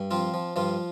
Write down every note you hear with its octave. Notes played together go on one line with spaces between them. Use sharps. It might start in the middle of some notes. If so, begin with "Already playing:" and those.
Already playing: G2
F3 C4 F4
F3
G2 F3 F4